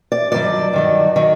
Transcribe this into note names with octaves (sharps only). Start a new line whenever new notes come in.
D5
G2 D#3 F#3 D5
G2 D#3 F#3
D#3 F#3